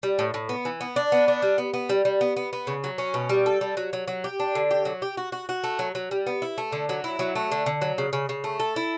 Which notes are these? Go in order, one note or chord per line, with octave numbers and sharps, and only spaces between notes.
G3
A2
A2
B3
E3
B3
D4
B3
D4
G3
B3
B3
G3
G3
B3
B3
B3
C#3
F#3
C#4
B2
G3
A4
G3
F#3
F#3
F#3
G4
D4
D3
G4
F#3
G4
F#4
F#4
F#4
A3
F#3
F#3
G3
B3
E4
A3
D3
F#3
E4
F#3
A3
D3
D3
F#3
C#3
C#3
C#3
A3
A4
E4